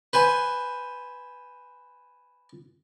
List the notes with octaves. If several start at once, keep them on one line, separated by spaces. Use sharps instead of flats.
B4 C5 G#5